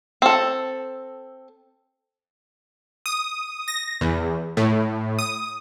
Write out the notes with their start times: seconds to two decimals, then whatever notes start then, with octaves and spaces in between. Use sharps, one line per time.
0.22 C4 A4
3.06 D#6
3.68 A#6
4.01 E2
4.57 A2
5.19 D#6